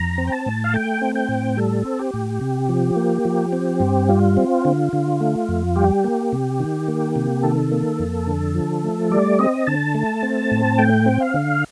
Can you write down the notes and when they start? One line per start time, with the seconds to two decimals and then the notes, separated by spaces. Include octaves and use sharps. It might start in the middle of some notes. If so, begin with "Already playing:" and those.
Already playing: F2 A#5
0.18 C4
0.27 G5
0.32 A5
0.46 A2
0.64 F5
0.74 A3 G5
1.02 C4
1.15 G5
1.29 A2
1.57 G3 A4
1.85 C4
1.99 G4
2.14 A2
2.41 C3
2.69 F3
2.96 A#3
3.25 F3
3.53 C4
3.80 G2
4.09 G3 F4
4.37 C4
4.65 D3
4.93 D3
5.20 A3
5.49 F2
5.76 G3 G4
6.04 A#3
6.32 C3
6.60 D#3
6.88 A#3
7.16 C3
7.43 D#3 A4
7.72 A#3
8.00 F2
8.27 D3
8.55 F3
8.84 A3
9.11 G3 D5
9.39 C4 D#5
9.67 D3 A5
9.95 A3
10.23 C4
10.51 A2
10.78 A3 G5
11.06 C4
11.20 F5
11.34 D3